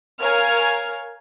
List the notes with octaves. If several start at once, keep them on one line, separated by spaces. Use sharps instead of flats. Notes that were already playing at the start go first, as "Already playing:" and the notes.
A#4 C#5 F5 G#5 F6 G#6